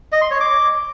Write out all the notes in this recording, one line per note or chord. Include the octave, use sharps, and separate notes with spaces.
D#5
C6
C#5
D6